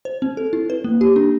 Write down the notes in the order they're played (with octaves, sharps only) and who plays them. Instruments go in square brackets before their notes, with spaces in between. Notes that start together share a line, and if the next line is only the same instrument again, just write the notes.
[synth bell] C5
C4
A4
E4
B4
A#3
G4
D4